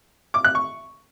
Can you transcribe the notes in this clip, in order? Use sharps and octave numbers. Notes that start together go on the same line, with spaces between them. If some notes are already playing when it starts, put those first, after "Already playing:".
D6
F#6
C#6